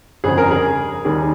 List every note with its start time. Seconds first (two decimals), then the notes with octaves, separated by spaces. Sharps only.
0.24 G1 F2 C#3 G#4
0.38 A#4
0.51 G#4
1.05 D#2 D#3 G3 G#4